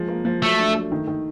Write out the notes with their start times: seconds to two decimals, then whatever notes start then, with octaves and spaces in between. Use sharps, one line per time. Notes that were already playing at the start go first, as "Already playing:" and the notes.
Already playing: F3 G#3
0.08 A#3
0.25 F3
0.43 F#3 A3
0.59 D4
0.74 A3
0.92 D#3
1.07 D#3